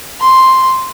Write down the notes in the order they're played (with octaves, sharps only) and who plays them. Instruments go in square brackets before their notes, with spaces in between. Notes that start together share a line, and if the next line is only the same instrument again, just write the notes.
[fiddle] C6